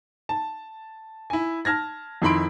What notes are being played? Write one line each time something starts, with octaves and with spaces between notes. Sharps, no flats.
A5
E4 G#5
A5 F6 G#6 A#6
F2 D#3 E4 B5 C6 D7